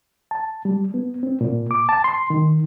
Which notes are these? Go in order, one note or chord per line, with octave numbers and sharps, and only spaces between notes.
A5
G3
B3
C4
A#2
D6
A5
C6
D#3